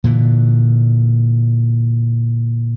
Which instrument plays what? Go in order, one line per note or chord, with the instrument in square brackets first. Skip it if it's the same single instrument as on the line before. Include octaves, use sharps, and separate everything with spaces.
[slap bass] A#2 D3 E3